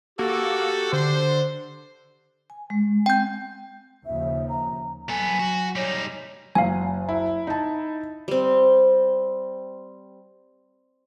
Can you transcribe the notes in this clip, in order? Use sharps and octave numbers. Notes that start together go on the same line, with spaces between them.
A#3 F#4 G4 A4
D3 C5
G#5
G#3
C4 G5 G6
D#2 C#3 F3 E5
A#5
F#3 B3 A4 G#5
F#4
G3 D#4 C#5
F#1 F#3 F5 G#5
E4
D#4 A5
G3 C4